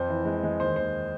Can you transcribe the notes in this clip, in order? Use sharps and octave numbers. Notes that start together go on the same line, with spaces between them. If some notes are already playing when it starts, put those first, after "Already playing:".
Already playing: F2 C5
E3
G#3
G#3
D#2 C5
D#2 C5